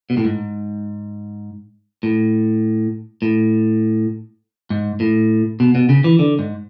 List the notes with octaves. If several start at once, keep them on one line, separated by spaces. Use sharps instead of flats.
B2
A2
G#2
A2
A2
G#2
A2
B2
B2
C#3
E3
D3
G#2